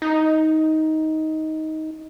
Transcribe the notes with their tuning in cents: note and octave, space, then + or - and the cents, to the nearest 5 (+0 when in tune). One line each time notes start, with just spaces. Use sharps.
D#4 +15